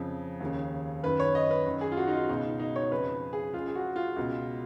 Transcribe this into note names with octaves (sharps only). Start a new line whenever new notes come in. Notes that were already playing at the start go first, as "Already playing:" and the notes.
Already playing: F2 C#3
D#2 C#3
F#2 D#3 B4
C#5
D#5
B4
F#2 D#3
G#4
F4
F#4
D#4
F4
C#2 B2 D#4
D#4
C#5
F2 C#3 B4
G#4
C#2 C#3 F4
G#4
F#4
F4
C#2 B2